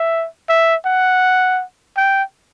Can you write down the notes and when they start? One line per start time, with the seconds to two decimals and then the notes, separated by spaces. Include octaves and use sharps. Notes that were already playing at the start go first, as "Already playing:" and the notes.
Already playing: E5
0.49 E5
0.86 F#5
1.97 G5